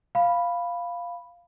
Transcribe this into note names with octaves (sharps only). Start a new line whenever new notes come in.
F5 B5